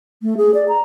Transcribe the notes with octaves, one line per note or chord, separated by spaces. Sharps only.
A3
G#4
D5
A#5